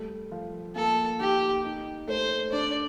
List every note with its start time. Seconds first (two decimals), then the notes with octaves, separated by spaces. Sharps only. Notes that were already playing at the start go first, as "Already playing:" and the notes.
Already playing: G3 A3
0.32 F3
0.75 A#3 A4
1.20 D#3 G4
1.64 D#4
2.07 A3 C5
2.52 D4 D5